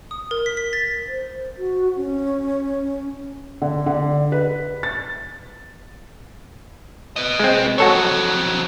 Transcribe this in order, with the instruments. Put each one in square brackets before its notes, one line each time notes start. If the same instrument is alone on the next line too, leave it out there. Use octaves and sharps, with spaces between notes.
[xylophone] D#6
A#4
B6
B6
A6
[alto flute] C5
F#4
C#4
[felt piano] D3
D3
B4
A6
[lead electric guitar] B4 D#5
[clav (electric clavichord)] G#3 C4
[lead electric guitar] F2 F#3 [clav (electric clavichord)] F#4 A4 C#5